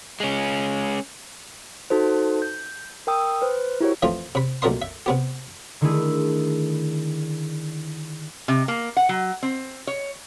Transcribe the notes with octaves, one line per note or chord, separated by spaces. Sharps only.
G#3 C#4
D#4 F#4 A4 C5
G6
A#4 G5 D#6 E6
B4 C5
E4 F#4 G4 A#4 C5 C#5
E3 F3 A3 C4 F4
C3 B5
B1 A#2 A3 A#4 D#5 C6
E5
C3 B3 G4
D3 D#3 A3 D4 E4 G#4
C3
A#3
F#5
F#3
C4
C#5